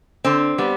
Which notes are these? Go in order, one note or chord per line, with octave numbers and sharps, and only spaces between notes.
D3 C4
G3 B3